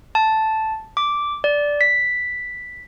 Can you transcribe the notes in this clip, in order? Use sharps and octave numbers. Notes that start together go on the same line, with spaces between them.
A5
D6
D5
B6